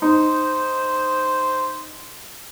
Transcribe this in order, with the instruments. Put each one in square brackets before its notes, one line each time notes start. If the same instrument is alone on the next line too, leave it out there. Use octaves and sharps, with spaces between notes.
[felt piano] D#4 [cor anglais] C5